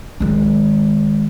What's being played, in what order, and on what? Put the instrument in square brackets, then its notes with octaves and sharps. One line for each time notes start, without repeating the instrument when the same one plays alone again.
[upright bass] D#3 G#3